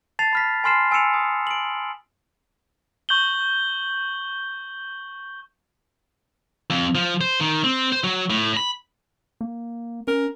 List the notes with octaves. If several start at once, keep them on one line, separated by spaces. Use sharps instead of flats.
A5 A6 C7 F7
B5 F6 B6
G#5 B5 C6 F6 C7 E7
G#5 E6 F6 C#7 E7 F7
G#5 D#6
D7 F#7
C#6 G6 F#7 G7
F2
F3
C5
D#3
C4
C5
F#3
A2
B5
A#3
C#4 A#4